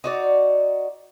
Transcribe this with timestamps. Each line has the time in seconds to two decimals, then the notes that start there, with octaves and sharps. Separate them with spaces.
0.04 D#4 F#4 D5